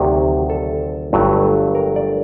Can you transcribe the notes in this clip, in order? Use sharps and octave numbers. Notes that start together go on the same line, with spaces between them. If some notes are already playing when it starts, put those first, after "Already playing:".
Already playing: D2 C3 D#3 F#3 G4
A4
G1 G2 F#3 A3
A#4
D5